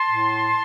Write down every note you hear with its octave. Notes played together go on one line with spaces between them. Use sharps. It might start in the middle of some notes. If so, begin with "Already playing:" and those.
Already playing: A5 C6
A2